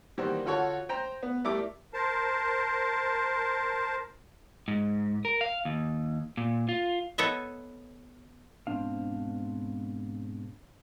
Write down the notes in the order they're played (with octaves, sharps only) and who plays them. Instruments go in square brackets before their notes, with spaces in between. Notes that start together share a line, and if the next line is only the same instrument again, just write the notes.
[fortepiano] D#3 E3 G3 A#3 F#4 C5
D3 F4 F#4 A4 C#5
C5 G5 A#5
B3
G3 A3 E4 A4 A#4 D6
[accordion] A#4 C5 A5
[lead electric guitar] G#2
A#4
F5
D#2
A#2
F4
[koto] B3 A4 C#5 D#5 E5
[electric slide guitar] G#2 B2 E3 C4 D4 F5